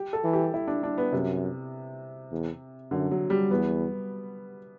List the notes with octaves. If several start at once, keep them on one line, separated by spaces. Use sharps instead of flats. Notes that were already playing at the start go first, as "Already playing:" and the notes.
Already playing: G4
A4
E3
G4
E4
D4
D4
B3
F#2 C3
E2
F#2 D3
F#3
G3
E2 B3